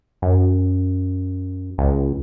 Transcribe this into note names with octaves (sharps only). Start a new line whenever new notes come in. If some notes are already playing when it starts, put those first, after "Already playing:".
F#2
C#2